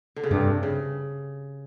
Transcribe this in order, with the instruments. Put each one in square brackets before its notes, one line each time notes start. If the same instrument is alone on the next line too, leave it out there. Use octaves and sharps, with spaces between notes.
[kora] D3
C#3
[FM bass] G2 [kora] C3
[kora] C#3